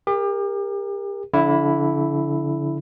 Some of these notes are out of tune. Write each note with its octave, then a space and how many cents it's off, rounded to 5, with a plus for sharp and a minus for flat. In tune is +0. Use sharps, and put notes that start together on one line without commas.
G4 +35 A#4 +0
D3 -35 F3 +0 E4 +0